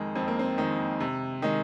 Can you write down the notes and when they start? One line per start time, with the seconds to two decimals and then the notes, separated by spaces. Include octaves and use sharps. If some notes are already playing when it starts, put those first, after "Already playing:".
Already playing: F2 D#3 G#3 D#4
0.15 F2 C4
0.28 A#3
0.39 C4
0.58 D#3 G#3
1.00 C3
1.42 D#3 G#3